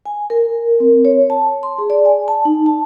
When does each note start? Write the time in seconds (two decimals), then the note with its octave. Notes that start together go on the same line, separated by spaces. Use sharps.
0.06 G#5
0.30 A#4
0.80 C4
1.05 C#5
1.30 A5
1.63 C6
1.78 G#4
1.90 D5
2.05 G#5
2.28 A5
2.45 D#4
2.66 A5